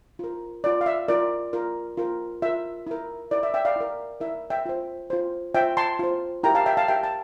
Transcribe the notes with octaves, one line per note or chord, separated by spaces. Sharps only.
F4 A#4
F4 A#4 D5
F5
E5
F4 A#4 D5
F4 A#4
F4 A#4
F4 A#4 E5
E4 A#4
E4 A#4 D5
E5
E5 G5
D5 F5
E4 A#4
E4 A#4 E5
E5 G5
F4 C5
F4 C5
F4 C5 E5 G5
A5 C6
F4 C5
E4 G4 A#4 G5 A#5
F5 A5
E5 G5
F5 A5
E4 G4 A#4 E5 G5
A5